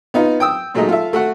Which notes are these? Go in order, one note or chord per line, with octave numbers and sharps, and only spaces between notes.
B3 D#4 F4
G5 D#6 E6
A#2 F#3 G#3 A3 D#4 D#5
F4 A4 E5
A3 F#4 F#5